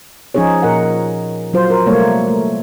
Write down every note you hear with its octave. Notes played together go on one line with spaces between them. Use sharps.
F3 C#4 D#4 G#4 C#5
A#2 A#4 D#5 F#5
F#3 F4 C5
A#4
C3 G3 A3 A#3 C#5
A3